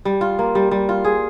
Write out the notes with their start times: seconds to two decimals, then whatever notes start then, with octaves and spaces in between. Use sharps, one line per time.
0.05 G3
0.21 F4
0.39 A#3
0.55 G3
0.71 G3
0.89 F4
1.04 G#4